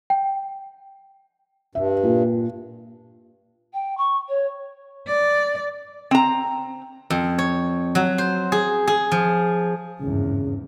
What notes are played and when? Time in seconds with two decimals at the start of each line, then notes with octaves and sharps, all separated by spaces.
0.10 G5
1.75 G2 E5
2.03 A#2
3.73 G5
3.97 C#6
4.29 C#5
5.07 D5
6.11 C4 A#5
7.10 F2
7.39 C#5
7.95 F#3
8.18 C5
8.52 G#4
8.87 G#4
9.12 F3
10.01 G#1 E2 G2 C#3